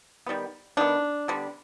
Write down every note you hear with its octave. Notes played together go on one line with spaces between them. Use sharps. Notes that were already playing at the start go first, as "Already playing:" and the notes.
D#3 G3 B3
D#3 B3 D4
D3 G3 B3